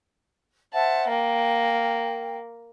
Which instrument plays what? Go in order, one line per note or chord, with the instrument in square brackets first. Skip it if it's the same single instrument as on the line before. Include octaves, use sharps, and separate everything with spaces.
[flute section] C5 E5 F#5 [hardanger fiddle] A5
[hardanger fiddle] A#3 [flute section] G5